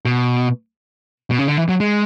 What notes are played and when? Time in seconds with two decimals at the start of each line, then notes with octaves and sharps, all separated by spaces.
0.05 B2
1.31 B2
1.39 C#3
1.48 D3
1.57 E3
1.69 F#3
1.80 G#3